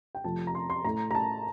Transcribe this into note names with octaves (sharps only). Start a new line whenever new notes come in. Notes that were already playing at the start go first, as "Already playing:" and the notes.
G5
F2 C3 F3 A3 A5
A#5
C6
C6
A2 A3 A#5
A#5
A5